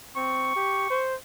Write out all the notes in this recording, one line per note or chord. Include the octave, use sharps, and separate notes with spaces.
C4 C#6
G4
C5